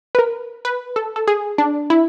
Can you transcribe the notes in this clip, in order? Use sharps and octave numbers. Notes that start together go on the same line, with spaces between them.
B4
A#4
B4
A4
A4
G#4
D4
E4